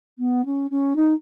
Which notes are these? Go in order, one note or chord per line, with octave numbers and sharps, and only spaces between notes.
B3
C#4
C#4
D#4